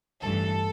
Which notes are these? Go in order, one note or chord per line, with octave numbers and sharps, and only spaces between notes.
A1 G2 E3 A4